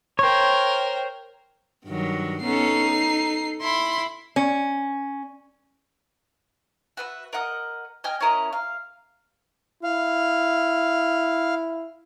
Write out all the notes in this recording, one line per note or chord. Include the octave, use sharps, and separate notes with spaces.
A#4 C5 C#5 G5
G2 D#3 F#3
B3 C#4 D#4 A4 C7
A4
E4 B5 C6
C#4
F#4 B4 E5
A#4 D#5 F#5 D#6
D#5 G5 G#5 F6
C#4 E4 A#4 D#5
F5
E4 F5